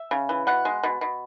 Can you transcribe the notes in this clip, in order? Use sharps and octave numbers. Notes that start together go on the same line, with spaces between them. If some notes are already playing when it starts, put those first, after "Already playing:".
Already playing: E5
C#3
E3
B2 F#5
G#3
B2
B2